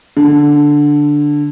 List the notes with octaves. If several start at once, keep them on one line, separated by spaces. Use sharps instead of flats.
D3